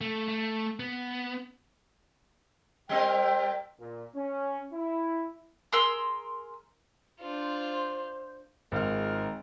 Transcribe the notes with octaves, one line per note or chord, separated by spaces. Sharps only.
A3
A3
B3
G3 C4 A#4 G5
A#2
C#4
E4
G#4 A#4 C6 E6
D4 F4 C5
G#1 F4 A#4 F6